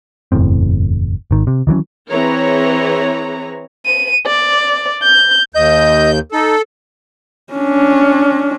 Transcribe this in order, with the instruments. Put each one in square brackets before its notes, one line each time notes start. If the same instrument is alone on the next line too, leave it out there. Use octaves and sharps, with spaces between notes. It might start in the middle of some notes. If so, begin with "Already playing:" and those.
[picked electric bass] F#1 E2 A2 C4
G#1 D#3
C3
D#3 E3 F#3 C#4
[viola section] E3 C4 G#4 B4 C#5 A#5
[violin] D#7
D5
G6
[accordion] D#2 G6 [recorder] D#5
[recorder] D#4 [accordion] A4
[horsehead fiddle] C#4 D4